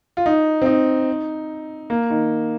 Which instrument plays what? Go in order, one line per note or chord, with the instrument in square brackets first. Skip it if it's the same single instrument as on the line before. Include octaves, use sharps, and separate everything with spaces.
[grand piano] F4
D#4
C4
D#4
A#3
D#3